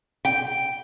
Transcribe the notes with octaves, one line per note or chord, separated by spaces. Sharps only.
G5